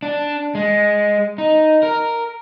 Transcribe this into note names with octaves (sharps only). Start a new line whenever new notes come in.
D4
G#3
D#4
A#4